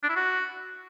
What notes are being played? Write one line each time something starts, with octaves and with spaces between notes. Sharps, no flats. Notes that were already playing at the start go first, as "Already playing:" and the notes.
D4
E4
F#4